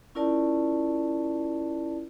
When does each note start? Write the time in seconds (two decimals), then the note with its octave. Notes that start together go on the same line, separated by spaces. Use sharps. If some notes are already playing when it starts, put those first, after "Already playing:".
0.15 C#4 E4 F4 A#4 D5 A5